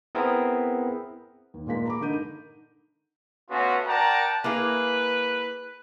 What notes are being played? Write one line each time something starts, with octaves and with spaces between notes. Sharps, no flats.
B3 C4 E4 G#4 A#4
D#2
A#2 G#3 A#3 B6
A#5 B5 D6
D3 D#4 A#4 G6 D#7
A3 B3 C#4 F4 F#4
A#4 D5 F#5 G5 A5 A#5
A#3 E4 G#4 B4